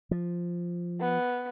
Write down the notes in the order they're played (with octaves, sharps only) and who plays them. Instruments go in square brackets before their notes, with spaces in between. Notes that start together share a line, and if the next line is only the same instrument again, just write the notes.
[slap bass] F3
[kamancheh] B3